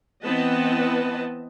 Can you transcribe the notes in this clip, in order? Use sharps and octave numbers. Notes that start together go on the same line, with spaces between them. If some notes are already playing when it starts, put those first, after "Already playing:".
E3 B3 C4 B4 D#5 A5